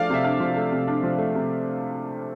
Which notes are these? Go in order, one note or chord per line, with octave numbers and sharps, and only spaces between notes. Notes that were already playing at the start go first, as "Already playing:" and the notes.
Already playing: F3 A3 D4 D5 F5
C3 E5
D4 F5
F3
A3
C3
D4
F3
A3
C3